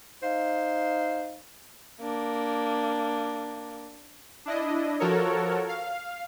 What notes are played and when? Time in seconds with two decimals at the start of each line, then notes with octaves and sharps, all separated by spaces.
0.23 D#4 C5 F5
2.01 A#3 D4
4.46 D4 E4 D#5
5.00 F3 F#4 A4 A#4 C#5
5.68 F5